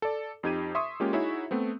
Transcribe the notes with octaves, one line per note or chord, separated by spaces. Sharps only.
A4 D5
F2 D#4 G4 G#6 D#7
E5 C6 C#6 D#6
G#3 A#3 C#4 F4 G4
D#4 E4 F#4 G#4 C#5 E5
A3 B3 C4